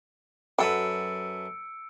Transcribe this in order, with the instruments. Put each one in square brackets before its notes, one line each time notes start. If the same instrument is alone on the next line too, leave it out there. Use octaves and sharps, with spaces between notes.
[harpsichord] F#2 A4 B4 [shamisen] F#3 [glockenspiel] E6 C#7 D7